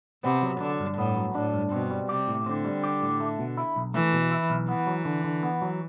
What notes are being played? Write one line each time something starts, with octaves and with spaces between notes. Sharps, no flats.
C3 B3
F#3
D3 D4
G2
A2 B3
F#3
A2 D4
G2
B2 C4
G3
C3 G4
A2
D3 C4
G3
G4
A2
A3
B2
E4
B1
E3 A3
B2
E4
B1
E3 B3
F#3
D3
D3
B3
F#3